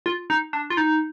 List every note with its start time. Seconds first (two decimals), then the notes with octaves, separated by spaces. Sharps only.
0.06 F4
0.30 D#4
0.53 D4
0.70 F4
0.77 D#4